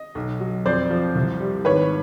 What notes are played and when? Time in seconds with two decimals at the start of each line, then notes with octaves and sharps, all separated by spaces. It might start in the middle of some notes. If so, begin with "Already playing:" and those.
Already playing: D#5
0.15 B1
0.40 F#3
0.66 F2 C5 D5
0.90 F3
1.15 C2
1.40 G3
1.65 G#1 B4 C#5